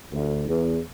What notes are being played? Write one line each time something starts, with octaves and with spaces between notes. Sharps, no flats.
D2
E2